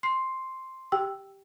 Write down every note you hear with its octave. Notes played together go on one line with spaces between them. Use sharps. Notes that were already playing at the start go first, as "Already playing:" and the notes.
C6 C7
G4 G5 E6